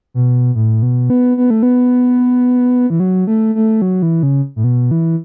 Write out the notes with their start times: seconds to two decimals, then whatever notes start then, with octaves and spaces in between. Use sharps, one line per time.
0.14 B2
0.55 A2
0.82 B2
1.10 B3
1.37 B3
1.50 A3
1.63 B3
2.90 E3
3.00 F#3
3.27 A3
3.55 A3
3.82 F#3
4.02 E3
4.23 C#3
4.56 A2
4.64 B2
4.91 E3